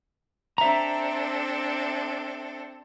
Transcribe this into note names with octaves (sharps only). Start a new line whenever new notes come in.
C4 D4 A4 E5 A#5